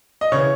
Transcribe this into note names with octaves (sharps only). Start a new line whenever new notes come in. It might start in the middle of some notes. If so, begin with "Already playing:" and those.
D#5
C#3 E3 C#5